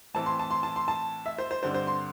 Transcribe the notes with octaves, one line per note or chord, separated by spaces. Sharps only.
A2 E3 C4 A5
C6
A5
C6
A5
C6
A5
E5
C5
C5
G2 D3 C4 C5
C5
C6